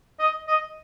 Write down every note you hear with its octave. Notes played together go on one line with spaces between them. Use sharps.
D#5
D#5